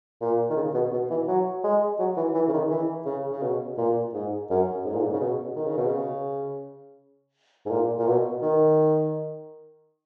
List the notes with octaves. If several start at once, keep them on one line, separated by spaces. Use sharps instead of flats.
A#2
D#3
C#3
B2
B2
E3
F#3
G#3
F#3
E3
E3
C#3
D#3
E3
C#3
C#3
B2
A#2
G#2
F#2
G#2
A#2
G#2
C#3
B2
D#3
C#3
B2
C#3
G#2
A#2
A#2
B2
D#3